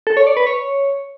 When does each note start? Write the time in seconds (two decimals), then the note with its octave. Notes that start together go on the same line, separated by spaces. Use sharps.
0.07 A4
0.17 C#5
0.27 D5
0.37 B4
0.47 C#5